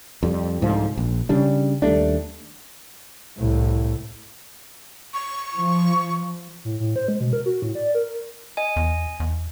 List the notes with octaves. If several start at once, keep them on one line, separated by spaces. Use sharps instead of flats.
F2 G3
C2 G#2 D3 F3
A#1
C#3 G3 D4
D#2 G3 A3 D4
C2 A2
C#6
F3
A2
A2
C5
G#3
B2
A#4
F#4
A2
D5
A#4
D#5 G#5
E2
E2